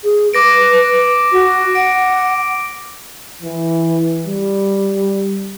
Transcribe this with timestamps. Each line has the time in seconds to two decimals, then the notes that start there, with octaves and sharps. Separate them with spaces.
0.04 G#4
0.34 B4 D6 A#6 D7
1.32 F#4
1.75 F#5 D7
3.42 E3
4.27 G3